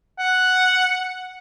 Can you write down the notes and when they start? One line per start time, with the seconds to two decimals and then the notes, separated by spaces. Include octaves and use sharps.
0.19 F#5